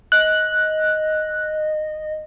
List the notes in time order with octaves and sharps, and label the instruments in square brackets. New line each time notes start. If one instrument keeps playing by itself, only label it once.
[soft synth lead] D#5 [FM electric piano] F#6